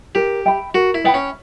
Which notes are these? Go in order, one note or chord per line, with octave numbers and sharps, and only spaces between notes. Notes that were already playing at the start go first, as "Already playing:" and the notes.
G4 A#4
E5 G5 B5
F#4 A#4
E4
B3 E5 G5 B5
C#4